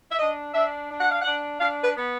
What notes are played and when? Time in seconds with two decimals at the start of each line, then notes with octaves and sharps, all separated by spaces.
0.12 E5
0.19 D4 D#5
0.54 D4 E5
0.89 D4
1.01 F#5
1.11 F5
1.22 D4 F#5
1.60 D4 F5
1.84 B4
1.96 B3